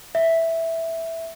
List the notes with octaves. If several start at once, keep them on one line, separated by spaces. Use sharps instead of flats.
E5